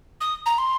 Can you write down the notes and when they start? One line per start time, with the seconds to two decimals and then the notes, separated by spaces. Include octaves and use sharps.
0.21 D#6
0.46 A#5
0.58 C6